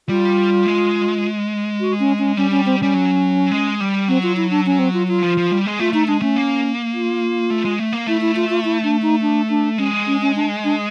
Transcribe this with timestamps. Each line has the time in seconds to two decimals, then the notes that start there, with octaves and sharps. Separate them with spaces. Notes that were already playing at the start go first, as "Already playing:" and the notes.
0.09 G3 F4
0.66 G#3
1.80 F#4
2.00 C#4
2.19 C#4
2.37 G3 C#4
2.51 C#4
2.66 C4
2.80 G3 C#4
2.94 F#3
3.51 G#3
3.80 G3
4.08 F#3 C4
4.23 F4
4.37 E4
4.51 D4
4.66 C#4
4.79 C4
4.93 F4
5.08 F4
5.22 F3
5.37 F3
5.51 G3
5.66 G#3
5.79 A3 F4
5.93 A3 D#4
6.07 G#3 D4
6.22 A3 C#4
6.36 A#3
6.94 F4
7.50 A3
7.65 G#3
7.80 A3
7.93 A#3
8.07 A3 E4
8.21 E4
8.36 F4
8.50 F4
8.65 E4
8.83 D4
9.02 D#4
9.22 D4
9.49 D4
9.78 G#3 C#4
10.07 C#4
10.22 C#4
10.36 D4
10.64 D4